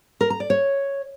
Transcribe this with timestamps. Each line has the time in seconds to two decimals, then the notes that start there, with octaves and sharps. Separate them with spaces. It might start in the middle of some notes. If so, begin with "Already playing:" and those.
0.21 A#4
0.30 A#5
0.40 D5
0.50 C#5